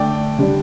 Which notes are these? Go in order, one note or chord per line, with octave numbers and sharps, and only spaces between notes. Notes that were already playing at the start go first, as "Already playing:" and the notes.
Already playing: D3 A3 D4 D5 G5
D3 G3 D4